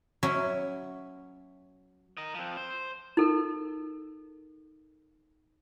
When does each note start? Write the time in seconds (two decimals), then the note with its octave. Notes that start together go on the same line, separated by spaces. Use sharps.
0.23 F#3 C#4 E4 F#4
2.17 A#4 D#5
2.35 F3 C4
2.57 C5
3.17 D#4 A4 A#4